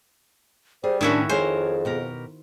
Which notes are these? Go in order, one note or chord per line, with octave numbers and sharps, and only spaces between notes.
G3 G#4 C5
A2 D#3 C#4 D4 E4 F#4
F2 G#4 A#4 C5 C#5 G#5
B2 G4 A#4